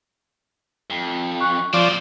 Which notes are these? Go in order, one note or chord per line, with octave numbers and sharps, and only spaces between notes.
F2
C#6 F#6
A#2 F3 C4 D5